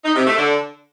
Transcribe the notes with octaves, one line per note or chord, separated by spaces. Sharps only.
D#4
C3
A3
D3